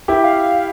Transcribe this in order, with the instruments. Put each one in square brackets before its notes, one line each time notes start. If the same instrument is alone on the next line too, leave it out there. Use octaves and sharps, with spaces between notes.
[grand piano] E4 G4
[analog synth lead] F5